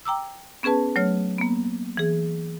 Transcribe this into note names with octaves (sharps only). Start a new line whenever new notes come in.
G5 A#5 D6 E6
B3 C#4 G#4 B4 A5
F#3 A3 C#5 F6
A#3 B3
E3 G#4